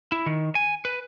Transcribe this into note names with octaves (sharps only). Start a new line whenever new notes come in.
E4
D#3
G#5
B4